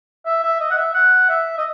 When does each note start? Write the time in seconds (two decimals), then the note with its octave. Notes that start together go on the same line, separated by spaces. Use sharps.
0.26 E5
0.43 E5
0.60 D#5
0.71 F#5
0.77 E5
0.94 F#5
1.29 E5
1.58 D#5